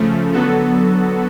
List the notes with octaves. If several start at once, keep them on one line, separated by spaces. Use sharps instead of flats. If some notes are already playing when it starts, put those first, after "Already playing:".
Already playing: C#3 F3 A3
D3 F#3 B3 F#4 A4